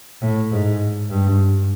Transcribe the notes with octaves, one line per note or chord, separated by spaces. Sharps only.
A2
G#2
G2